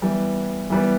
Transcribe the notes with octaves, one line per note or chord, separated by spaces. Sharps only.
E3 G3 B3
E3 G3 B3